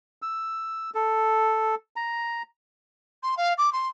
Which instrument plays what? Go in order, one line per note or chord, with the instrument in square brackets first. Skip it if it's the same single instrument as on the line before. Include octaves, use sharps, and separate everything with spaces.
[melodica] E6
A4
A#5
[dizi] C6
F5
D6
C6